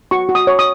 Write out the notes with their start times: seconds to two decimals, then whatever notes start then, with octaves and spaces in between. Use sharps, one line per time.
0.11 F#4 C#6
0.29 F#4
0.35 D#6
0.47 C#5
0.59 D#6